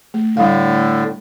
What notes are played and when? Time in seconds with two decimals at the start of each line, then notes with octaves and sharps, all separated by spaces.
0.14 A3
0.37 A2 D3 G3 F5